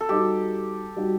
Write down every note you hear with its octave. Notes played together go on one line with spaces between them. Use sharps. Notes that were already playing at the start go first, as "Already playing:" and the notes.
A4
G3 D#4 F#4 G4
G3 D#4 F#4